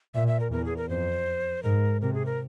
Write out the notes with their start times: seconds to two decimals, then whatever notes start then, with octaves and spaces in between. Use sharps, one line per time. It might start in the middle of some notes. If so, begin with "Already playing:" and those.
0.15 A#2 E5
0.27 E5
0.40 A#4
0.52 E2 A#4
0.65 G#4
0.77 A#4
0.89 F2 C5
1.63 G#2 A#4
2.01 C3 A#4
2.14 G#4
2.26 A#4